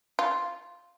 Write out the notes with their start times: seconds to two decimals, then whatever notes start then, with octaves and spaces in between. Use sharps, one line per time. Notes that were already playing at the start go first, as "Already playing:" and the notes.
0.19 F4